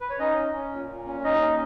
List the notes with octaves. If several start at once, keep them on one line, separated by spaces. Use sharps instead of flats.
B4
C#5
C#4 D#4 D#5
C#4
C#4
A#2
A#2
C#4
D#2 D#4 D#5
C#4